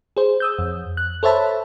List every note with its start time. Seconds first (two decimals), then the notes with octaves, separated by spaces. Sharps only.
0.17 G#4 C5
0.40 D#6 E6 G6
0.58 F2
0.97 F#6
1.23 A4 C5 C#5 E5 A5 B5